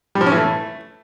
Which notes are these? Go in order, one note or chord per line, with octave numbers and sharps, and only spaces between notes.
G3
F3
C#4
E3
A3